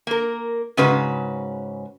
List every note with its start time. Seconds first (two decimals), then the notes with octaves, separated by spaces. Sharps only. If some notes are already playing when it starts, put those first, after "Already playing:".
0.07 A#3 A#4
0.77 G#2 C#3 C#4 F#4 B4